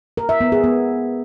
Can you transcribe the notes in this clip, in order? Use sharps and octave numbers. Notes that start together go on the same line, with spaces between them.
A#4
E5
B3
G#4
B3